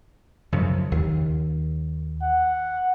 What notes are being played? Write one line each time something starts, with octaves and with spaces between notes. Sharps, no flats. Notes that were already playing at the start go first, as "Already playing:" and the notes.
F#2 C#3 F3
D#2
F#5